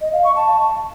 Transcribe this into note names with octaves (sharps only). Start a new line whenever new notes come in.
D#5
F5
C#6
A5